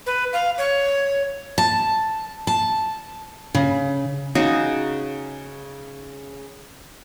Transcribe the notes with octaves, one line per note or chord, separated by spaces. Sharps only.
B4
F5
C#5
A5
A5
C#3
C#3 D#4 F#4 G#4